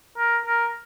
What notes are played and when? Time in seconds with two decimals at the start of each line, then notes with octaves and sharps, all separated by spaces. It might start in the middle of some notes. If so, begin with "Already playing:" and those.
0.18 A#4
0.46 A#4